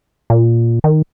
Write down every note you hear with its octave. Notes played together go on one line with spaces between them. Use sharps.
A#2
D#3